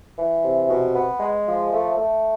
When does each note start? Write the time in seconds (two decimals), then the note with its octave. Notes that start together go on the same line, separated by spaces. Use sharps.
0.17 E3
0.44 C3
0.68 B2
0.94 B3
1.19 G#3
1.46 F3
1.72 A3
1.97 A3